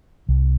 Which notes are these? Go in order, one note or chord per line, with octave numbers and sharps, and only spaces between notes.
C2